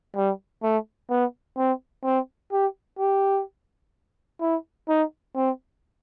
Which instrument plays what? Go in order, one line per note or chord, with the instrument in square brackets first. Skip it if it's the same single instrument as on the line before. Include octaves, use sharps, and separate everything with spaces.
[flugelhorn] G3
A3
B3
C4
C4
G4
G4
E4
D#4
C4